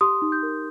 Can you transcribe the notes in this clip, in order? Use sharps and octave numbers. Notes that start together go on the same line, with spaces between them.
G4 C6 D#6
D#4
D#6 G6
A#4